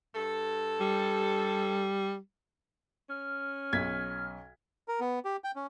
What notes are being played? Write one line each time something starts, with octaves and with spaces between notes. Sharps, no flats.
G2 A4
G3
C#4 F6
B1 G#6 B6
A#4
B3
G4
G5
C#4